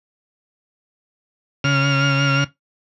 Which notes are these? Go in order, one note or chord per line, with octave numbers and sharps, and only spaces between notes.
C#3 F6